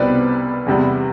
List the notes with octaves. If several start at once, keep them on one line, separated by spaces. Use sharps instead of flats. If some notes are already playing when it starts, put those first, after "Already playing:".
Already playing: C2 B2 G3 C4 B4 D5
E2 C3 G3 B3